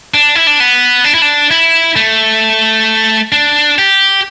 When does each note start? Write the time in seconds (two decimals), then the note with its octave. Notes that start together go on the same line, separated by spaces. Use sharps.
0.14 D4
0.35 E4
0.47 D4
0.60 B3
1.04 D4
1.14 E4
1.22 D4
1.51 E4
1.96 A3
3.32 D4
3.78 G4